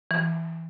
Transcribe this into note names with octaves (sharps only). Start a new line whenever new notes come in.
E3